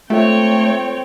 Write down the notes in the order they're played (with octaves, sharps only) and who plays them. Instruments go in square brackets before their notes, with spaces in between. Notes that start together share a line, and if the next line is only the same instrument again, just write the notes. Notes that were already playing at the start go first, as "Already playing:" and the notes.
[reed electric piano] G#3 F4 A4 [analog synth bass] A3 [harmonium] C4 [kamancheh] C#5 G5